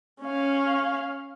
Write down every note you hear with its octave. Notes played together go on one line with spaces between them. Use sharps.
C#4 F5